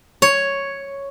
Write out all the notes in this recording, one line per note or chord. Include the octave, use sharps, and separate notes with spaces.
C#5